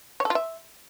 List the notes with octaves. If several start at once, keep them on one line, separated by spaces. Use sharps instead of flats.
C#5
A4
F4
E5